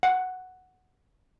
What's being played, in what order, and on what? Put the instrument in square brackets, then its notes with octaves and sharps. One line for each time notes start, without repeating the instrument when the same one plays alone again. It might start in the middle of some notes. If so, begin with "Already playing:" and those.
[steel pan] F#5